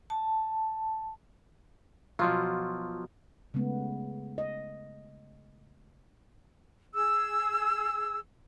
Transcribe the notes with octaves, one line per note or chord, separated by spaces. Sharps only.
A5
B2 F3 F#3 F4
C#3 G#3 A3 B3
D#5
G#4 E6